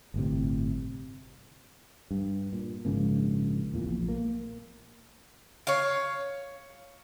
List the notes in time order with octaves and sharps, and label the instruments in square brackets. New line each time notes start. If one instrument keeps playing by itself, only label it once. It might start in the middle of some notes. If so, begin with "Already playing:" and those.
[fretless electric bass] G1 A2 C3
G2
A#2
A#1 G#2 C#3 A#3
E2 A#2
A#1
A#3
[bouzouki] C#5 F5